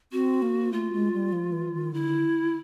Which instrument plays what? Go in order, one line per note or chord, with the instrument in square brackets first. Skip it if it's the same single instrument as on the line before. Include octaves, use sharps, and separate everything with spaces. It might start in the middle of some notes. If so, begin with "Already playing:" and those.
[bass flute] C4 [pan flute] F#4
[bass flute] A#3
[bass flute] A3 [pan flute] F4
[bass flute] G#3
G3
F3
E3
D#3
[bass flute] D3 [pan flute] E4